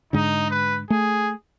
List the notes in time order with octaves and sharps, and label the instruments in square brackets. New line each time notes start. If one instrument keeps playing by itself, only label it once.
[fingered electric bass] G#2 D3 [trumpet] D#4
[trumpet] B4
[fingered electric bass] A3 [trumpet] G#4